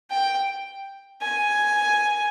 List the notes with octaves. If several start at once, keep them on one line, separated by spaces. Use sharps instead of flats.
G5
G#5